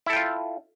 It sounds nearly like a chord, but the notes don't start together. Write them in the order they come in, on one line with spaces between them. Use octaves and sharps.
E4 A4 G5 F4